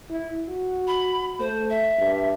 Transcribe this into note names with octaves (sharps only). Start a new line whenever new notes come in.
E4
F#4
B5
A3 C5
E5
G2